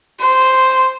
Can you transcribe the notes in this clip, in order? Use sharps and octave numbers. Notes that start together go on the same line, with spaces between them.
C5